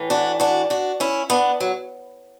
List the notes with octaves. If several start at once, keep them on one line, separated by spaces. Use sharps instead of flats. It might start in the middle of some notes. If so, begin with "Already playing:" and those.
Already playing: A2 E3
D4 F#4
D4 F#4
D4 F#4
C#4 E4
B3 D4
F#3